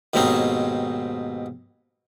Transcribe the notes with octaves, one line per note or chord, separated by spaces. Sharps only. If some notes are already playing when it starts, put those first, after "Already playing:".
D#2 G#2 B2 C4 C#4 D#4